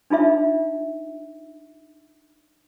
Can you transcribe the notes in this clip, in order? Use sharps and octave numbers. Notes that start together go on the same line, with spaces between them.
D4 D#4 F4 E5